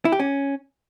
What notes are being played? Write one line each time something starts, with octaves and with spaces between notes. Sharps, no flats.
E4
G4
C#4